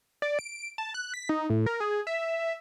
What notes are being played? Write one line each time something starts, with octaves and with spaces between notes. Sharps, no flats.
D5
D7
A5
F#6
B6
D#4
A2
A#4
G#4
E5